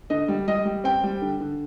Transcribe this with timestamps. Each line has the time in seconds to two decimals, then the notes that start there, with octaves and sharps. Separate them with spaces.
0.10 D3 D#5
0.28 G3
0.48 G3 D#5
0.65 G3
0.84 C4 G5
1.03 G3
1.21 D3
1.40 D3